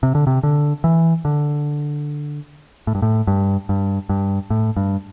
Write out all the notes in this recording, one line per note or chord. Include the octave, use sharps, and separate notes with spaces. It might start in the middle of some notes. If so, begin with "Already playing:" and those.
C3
D3
C3
D3
E3
D3
A2
G2
A2
G2
G2
G2
A2
G2